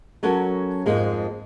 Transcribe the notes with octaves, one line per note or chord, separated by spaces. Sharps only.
F#3 C#4 F#4 A4 A#4
F2 G#2 G#3 A#3